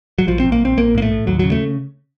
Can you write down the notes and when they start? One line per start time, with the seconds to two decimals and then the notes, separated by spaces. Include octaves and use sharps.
0.19 F#3
0.27 A#1 F3
0.40 C4
0.45 A#1
0.52 A#3
0.60 A#1 C4
0.77 A#1 A#3
0.95 A2 A#3
1.02 A3
1.11 A2
1.27 D#2 F#3
1.39 C#3 F#3
1.52 A3